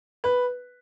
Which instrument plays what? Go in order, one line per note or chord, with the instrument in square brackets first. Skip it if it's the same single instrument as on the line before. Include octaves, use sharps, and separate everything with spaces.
[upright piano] B4